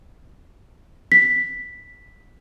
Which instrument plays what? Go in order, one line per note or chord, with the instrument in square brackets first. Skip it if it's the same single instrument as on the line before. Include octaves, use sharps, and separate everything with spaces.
[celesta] B6